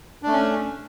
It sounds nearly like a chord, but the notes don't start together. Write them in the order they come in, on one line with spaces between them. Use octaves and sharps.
D4 A3 C#4